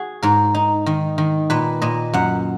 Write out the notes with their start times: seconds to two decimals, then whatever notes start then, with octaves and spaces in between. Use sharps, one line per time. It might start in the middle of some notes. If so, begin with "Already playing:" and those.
Already playing: F#4 G#4
0.23 G#2 A#4
0.54 D#4
0.86 D#3
1.18 D#3
1.50 A#2 B4
1.82 A#2 D#5
2.13 F#2 F#5